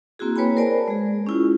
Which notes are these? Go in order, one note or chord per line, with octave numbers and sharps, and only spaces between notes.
A#3 C4 E4 F#4 G#4
A#3 B4 C#5 G5 G#5 B5
A#4 C5 D5 G#5 A5
G#3 G#4
C#4 E4 F4